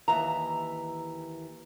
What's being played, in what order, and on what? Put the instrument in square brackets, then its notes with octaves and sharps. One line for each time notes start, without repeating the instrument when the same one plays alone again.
[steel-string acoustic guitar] D#2 E3 E5 A#5